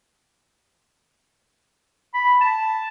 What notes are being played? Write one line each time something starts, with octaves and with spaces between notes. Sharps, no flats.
B5
A5